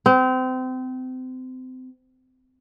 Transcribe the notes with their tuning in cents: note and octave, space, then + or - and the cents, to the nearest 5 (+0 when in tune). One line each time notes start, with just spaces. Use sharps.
C4 -30